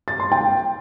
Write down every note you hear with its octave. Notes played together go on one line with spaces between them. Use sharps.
A6
C6
G5